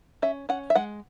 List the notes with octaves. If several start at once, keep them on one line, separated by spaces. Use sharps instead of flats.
C#4 E5
C#4 F#5
E5
G#3 F#5